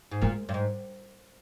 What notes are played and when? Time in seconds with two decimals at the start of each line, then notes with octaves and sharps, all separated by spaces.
0.12 G#2
0.22 A#2 G#3
0.49 G2
0.54 G#2